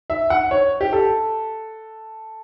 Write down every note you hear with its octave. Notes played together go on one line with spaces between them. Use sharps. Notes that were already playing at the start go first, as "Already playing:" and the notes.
E5
F#5
C#5
G4
A4